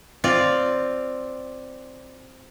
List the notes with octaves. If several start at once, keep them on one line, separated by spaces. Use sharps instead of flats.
C4 F4 D5